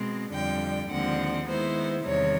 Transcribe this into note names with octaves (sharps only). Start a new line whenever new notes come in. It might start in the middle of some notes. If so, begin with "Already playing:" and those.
Already playing: B2 G#3 C4
F2 D3 G3 G5
D#2 D3 F3 G#3 C4 F#5
D#3 G#3 B3 E4 C5
E2 C3 D#3 G3 C#5